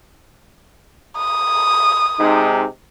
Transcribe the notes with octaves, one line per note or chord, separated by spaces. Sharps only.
D#6
C3 G#3 D#4